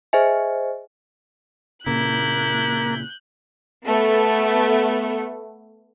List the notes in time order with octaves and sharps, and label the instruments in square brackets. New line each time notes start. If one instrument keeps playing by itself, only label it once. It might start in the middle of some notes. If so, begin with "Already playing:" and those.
[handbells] G#4 C5 D#5 E5 G#5
[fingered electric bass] A#2 C#3 [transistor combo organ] A#3 [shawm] E4 [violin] F#6 G6
[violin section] A3 B3